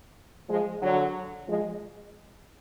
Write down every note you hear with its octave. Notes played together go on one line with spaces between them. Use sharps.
F3 G#3
D3 F#3
F3 G#3